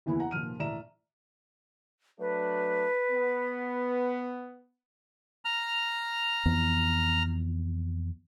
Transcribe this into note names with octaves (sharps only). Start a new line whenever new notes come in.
F#1 E2 E3 B3 E4
F#5 A#5
F1 A#2 F3 F6 D#7
E1 A2 D5 E5 A#5 E7
F#3 A3 D4 B4
B3
A#5 F6
F2 E3 B3